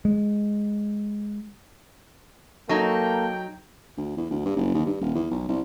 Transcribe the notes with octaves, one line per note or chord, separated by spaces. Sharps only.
G#3
F#3 A#3 D#4 A4 G5
D2
E2
D2
G2
F#1
D#2
G2
D#1
E2
B1
C2